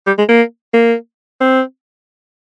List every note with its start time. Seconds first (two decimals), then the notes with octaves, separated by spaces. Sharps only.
0.07 G3
0.18 G#3
0.29 A#3
0.74 A#3
1.41 C4